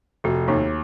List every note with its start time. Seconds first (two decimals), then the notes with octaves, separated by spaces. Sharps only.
0.24 F1 F#4
0.48 D#2 D#4